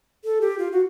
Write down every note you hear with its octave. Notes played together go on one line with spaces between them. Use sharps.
A4
G4
F4
F#4